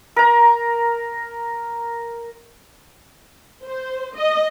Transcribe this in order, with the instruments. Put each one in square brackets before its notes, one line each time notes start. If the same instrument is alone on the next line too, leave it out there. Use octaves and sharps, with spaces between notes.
[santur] A#4 A#5
[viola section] C5
D#5